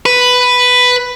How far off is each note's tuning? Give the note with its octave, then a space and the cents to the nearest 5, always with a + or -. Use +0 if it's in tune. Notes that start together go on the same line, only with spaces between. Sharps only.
B4 +5